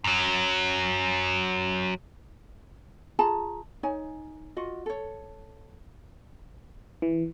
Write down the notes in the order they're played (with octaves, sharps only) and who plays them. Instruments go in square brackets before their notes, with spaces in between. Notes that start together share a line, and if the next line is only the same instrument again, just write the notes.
[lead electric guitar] F#2 F#3
[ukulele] F4 G#4 A5 A#5
D#4 C#5 G#5
F4 F#4 D#5
A4 C#5
[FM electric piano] E3